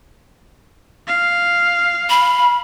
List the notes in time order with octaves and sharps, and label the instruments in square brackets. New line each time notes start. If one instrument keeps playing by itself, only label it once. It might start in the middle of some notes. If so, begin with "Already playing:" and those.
[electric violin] F5
[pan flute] B5